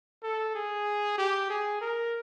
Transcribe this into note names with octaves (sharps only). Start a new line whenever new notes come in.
A4
G#4
G4
G#4
A#4